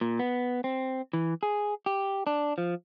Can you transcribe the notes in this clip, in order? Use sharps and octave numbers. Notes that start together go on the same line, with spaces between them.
A#2
B3
C4
E3
G#4
G4
D4
F3